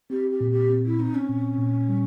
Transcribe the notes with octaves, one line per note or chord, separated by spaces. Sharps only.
C4 G4
G4
A#2
G4
C4
E4
C4 D#4
C#4
A#2
A#2
G3